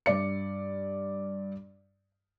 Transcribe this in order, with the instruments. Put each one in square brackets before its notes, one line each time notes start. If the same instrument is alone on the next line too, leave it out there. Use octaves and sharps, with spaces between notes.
[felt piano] G2 D5 C#7